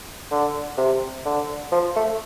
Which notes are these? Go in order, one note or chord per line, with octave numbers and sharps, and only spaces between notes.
D3
C3
D3
F3
A3